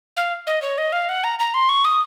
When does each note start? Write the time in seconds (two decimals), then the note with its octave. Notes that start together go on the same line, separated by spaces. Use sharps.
0.17 F5
0.47 D#5
0.62 C#5
0.78 D#5
0.92 F5
1.09 F#5
1.24 A#5
1.39 A#5
1.54 C6
1.69 C#6
1.85 D#6